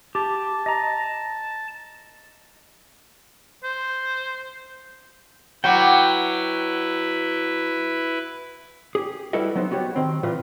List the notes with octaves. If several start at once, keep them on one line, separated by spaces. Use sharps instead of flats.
G4 A5
D#5 A#5
C5
F#3 E4 F#4 B4 F#5 G5 D6
G4 G#4
G3 E4 F#4 A4 B4 D#5
F#3 B3 D#4 C5
B3 F#4 G4 C#5
D#3 C4
A#2 E3 F4 B4 F5